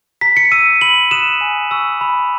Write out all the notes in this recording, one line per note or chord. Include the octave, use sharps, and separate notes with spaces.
A#5 B6
C#7
E6 D#7
B5 F#7
D#6 F#6 E7
G#5
C#6 E6
B5